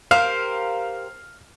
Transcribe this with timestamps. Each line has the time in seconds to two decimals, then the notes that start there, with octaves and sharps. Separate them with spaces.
0.11 G4 A#4 C5 F5 F6